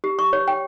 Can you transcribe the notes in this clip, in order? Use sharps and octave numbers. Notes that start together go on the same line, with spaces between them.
G4
C#6
C#5
G5